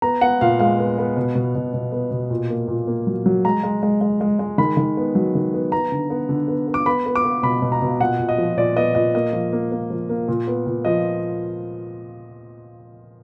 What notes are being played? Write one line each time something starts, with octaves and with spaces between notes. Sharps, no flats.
B3 A#5
B3 F#5
A#2 F5
G#3 F5
B3
B3
B2
B2
B2
B2
B3
B2
A#2
A#3
A#2
A#3
F#3
F#3
G#3 A#5
G#3
G#3
G#3
G#3
G#3
D#3 B5
D#3
B3
F#3
D#3
B3
B3 A#5
D3
B3
D3
B3
B3
D6
B3 B5
B3
D6
B3
B2 B5
B2
A#5
B2
A#2 F#5
A#2
D#5
F3
A#2 D5
B3 D#5
A#2 D#5
A#3 D#5
F3
A#3
A#3
F3
A#3
A#2
B3
A#2
F3 D#5